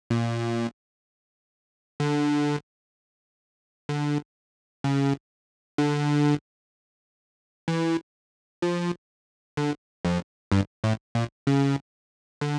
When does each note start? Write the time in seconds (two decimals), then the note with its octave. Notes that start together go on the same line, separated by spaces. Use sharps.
0.10 A#2
2.00 D3
3.89 D3
4.84 C#3
5.78 D3
7.68 E3
8.62 F3
9.57 D3
10.05 F2
10.52 G2
10.84 A2
11.15 A#2
11.47 C#3
12.41 D3